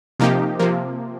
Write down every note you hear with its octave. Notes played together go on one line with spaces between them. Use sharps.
C3 F3 A#3 D#4 G4
C3 F3 A#3